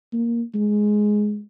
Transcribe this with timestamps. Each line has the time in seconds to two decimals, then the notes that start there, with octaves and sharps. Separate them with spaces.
0.13 A#3
0.55 G#3